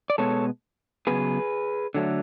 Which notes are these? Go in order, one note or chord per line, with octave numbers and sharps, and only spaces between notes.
D5
B2 G#3 B3 A4 C#5
C#3 F#3 B3 G#4 B4
D3 F#3 A3